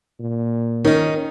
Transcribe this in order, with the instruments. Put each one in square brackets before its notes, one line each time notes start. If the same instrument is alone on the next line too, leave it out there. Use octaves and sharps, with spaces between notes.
[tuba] A#2
[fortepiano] D#3 [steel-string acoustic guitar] C#4 D#4